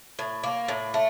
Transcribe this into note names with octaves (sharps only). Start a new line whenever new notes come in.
A2
A#3
A2
A3